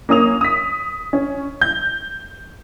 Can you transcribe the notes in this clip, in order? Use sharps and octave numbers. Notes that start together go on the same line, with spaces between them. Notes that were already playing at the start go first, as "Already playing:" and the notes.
A#3 C#4 D#6 F7
D#6 B6
C#4
G6